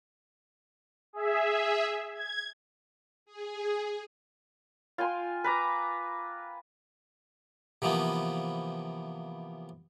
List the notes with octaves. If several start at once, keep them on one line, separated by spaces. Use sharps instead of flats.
G#4 E5
G#6
G#4
F4 G5 G#5 C6
B4 A#5 D6
C3 E3 F3 A#3 B3